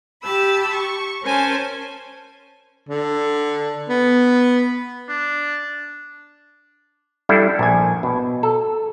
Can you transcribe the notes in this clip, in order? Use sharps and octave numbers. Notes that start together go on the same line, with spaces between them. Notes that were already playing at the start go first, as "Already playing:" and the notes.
G4 A5 B5 E6
C#6
C#4 A#4 C5 G#5 A5
D3
B3
D4
G3 D4 E4 A4
A#1 G#5
B2
A4